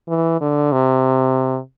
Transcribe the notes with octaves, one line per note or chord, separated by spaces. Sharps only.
E3
D3
C3